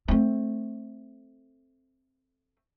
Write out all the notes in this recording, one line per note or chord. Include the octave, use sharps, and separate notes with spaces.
A3 C4